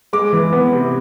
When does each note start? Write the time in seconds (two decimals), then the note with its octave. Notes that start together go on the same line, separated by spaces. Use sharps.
0.13 G#3 D6
0.33 E3
0.53 B3
0.73 C3